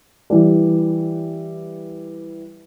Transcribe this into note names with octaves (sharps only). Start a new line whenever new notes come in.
E3 G3